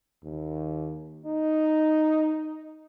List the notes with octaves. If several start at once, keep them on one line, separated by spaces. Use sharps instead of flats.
D#2
D#4